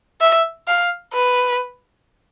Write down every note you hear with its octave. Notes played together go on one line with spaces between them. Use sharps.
E5
F5
B4